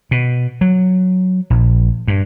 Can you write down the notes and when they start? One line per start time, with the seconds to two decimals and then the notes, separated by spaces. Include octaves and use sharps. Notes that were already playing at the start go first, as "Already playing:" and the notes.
0.11 B2
0.61 F#3
1.50 A#1
2.08 G2